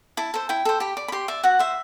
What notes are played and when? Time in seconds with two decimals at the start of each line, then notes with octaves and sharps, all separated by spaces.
0.17 E4 A5
0.34 A4 C5
0.49 E4 G5
0.65 A4 C5
0.80 G4 B5
0.97 D5
1.08 B5
1.12 G4 C6
1.28 D5 E5
1.43 F#4 F#5
1.59 C5 E5